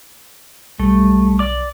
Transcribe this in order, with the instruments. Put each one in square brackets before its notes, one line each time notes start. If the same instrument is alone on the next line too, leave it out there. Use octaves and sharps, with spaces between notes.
[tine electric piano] B1 [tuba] G3 [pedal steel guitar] A3
[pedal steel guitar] D5 D6